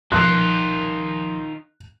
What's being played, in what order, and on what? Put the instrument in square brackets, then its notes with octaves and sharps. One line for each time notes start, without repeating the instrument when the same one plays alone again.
[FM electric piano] B1 F3 G6 [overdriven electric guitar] D#3 F4 [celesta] C6 [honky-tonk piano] F#6